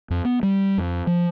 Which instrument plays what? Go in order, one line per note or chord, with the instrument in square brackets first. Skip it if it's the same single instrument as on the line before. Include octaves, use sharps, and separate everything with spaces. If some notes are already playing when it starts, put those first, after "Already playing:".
[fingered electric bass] F2
B3
G3
F2
F3